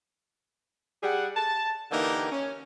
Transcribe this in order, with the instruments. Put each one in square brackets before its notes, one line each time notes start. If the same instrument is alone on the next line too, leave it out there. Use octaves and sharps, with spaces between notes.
[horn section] G3 G#4 F#5
A5
D3 E3 A#3 D#4 G4 A#4
C#4